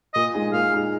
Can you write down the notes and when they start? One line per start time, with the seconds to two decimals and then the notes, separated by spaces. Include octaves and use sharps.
0.15 A#2 D#5
0.34 G#3 D#4 G#4
0.53 A#2 F5
0.72 G#3 D#4 G#4